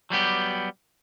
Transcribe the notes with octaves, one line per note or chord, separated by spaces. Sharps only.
F#3 G3 B3 G4